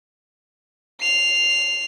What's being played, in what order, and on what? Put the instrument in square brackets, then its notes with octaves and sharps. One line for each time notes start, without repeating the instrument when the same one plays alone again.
[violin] C7 F7